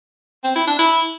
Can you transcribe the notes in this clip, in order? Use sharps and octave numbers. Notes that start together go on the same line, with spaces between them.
C4
E4
D4
E4